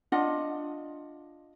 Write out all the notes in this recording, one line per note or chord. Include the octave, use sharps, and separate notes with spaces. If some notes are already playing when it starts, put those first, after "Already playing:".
D4 F4 D#5 F#5